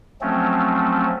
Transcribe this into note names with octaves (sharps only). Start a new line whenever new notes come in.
F3 F#3 A3 C4 C#4